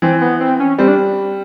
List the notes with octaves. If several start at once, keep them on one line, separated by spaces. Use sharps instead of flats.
E3 C4
B3
C4
C#4
G3 C4
D4